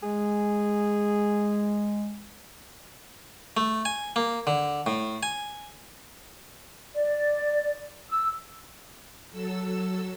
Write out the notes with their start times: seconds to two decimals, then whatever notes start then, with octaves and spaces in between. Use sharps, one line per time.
0.03 G#3 G#4
3.57 A3
3.85 G#5
4.16 A#3
4.47 D3
4.86 A2
5.23 G#5
6.95 D5
8.09 E6
9.31 F#3 A4 E6